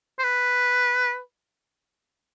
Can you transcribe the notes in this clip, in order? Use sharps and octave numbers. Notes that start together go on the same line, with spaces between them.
C5
B4